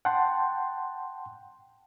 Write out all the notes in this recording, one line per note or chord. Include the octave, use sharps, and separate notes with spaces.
F#5 G5 A5 C6